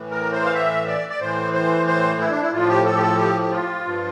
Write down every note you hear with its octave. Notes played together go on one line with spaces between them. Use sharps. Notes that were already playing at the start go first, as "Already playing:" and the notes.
Already playing: A2 E3
A#4
C5
F5
E5
D5
D5
A2 E3 C5
C5
C5
E4
D4
E4
A2 F3 F4
G4
A4
G4
A4
G4
G4
F4
G2 F3